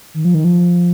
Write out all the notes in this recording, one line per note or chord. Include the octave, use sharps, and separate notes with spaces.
D#3
F3
D#3
F3